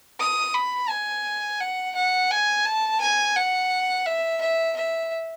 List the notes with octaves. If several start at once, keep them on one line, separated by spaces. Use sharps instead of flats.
D#6
B5
G#5
F#5
F#5
G#5
A5
G#5
F#5
E5
E5
E5